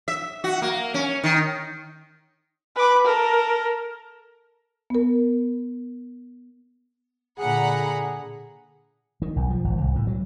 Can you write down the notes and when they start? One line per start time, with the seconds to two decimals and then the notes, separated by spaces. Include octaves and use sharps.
0.08 E5
0.44 F#4
0.62 A#3
0.94 C#4
1.24 D#3
2.76 B4 D6
3.04 A4 A#4
4.90 B3 A#4
7.39 A#2 D3 G#4 F#5 A#5 B5
9.22 D#3
9.36 B1
9.50 F3
9.64 G#1
9.81 C2
9.95 A2
10.07 F#3